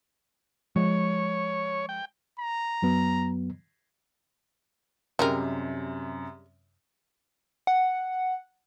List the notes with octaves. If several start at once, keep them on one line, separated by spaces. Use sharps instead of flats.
F3 G#3 C#5
G5
A#5
F#2 F#3 B3
F#2 C3 G3 G#3 A#4
F#5